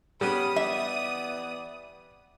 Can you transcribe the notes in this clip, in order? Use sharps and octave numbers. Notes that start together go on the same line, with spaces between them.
G3 B3 C#4 G4 D#6
E3 B3 D5 E5